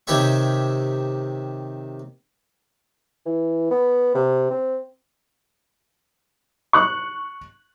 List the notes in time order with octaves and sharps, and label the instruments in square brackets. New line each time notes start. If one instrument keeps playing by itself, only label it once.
[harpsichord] C3 D#3 G4 C#5 E5 C#6
[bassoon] E3
B3
C3
C4
[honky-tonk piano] C#6 F#6